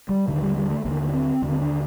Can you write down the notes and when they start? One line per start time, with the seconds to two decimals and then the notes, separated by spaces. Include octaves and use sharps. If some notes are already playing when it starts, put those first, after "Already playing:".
0.09 G3
0.28 D#2 D3 D#3
0.42 G3
0.57 G3
0.71 A3
0.85 D#2 D3 A#3
1.08 D4
1.13 C4
1.42 D#2 D3
1.50 C4
1.61 D4